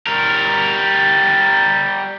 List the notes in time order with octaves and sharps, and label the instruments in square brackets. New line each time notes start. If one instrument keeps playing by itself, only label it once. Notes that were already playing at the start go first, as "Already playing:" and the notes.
[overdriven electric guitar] G3 A#4